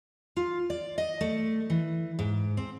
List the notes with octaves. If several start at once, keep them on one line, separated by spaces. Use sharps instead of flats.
F4
D5
D#5
A3
E3
G#2
C4